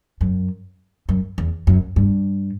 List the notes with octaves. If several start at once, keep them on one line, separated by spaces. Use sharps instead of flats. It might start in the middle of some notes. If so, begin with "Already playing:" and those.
F#2
F#2
E2
F#2
G2